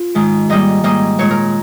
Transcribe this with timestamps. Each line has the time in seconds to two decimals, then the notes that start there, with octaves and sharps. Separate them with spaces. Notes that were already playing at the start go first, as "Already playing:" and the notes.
Already playing: F4
0.15 G#2 D#3 G#3
0.49 G#2 G3 A#3 D#5
0.84 G#2 G3 A#3 D#5
1.19 A#2 G#3 C#5
1.31 A#4